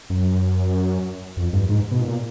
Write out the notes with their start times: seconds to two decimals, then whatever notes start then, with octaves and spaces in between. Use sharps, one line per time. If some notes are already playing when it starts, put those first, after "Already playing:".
0.10 F#2
1.37 F2
1.53 G2
1.69 G#2
1.92 B2
2.01 A#2